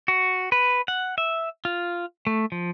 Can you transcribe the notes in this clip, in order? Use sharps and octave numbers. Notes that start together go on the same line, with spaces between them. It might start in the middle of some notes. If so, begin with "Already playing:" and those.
F#4
B4
F#5
E5
F4
A3
F3